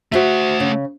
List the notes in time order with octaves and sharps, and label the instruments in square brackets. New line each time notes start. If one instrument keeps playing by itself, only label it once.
[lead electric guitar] A3 F#5 [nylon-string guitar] F#4 C5 E5
[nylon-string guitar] C#3